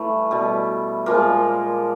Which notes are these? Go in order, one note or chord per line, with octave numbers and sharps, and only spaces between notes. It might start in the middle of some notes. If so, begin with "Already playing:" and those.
Already playing: A2 E3 G3 A3
B2 G3
A#2 F3 G#3 A#3